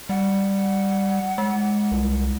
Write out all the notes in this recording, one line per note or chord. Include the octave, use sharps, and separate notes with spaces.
G3 F#5
G#3
C2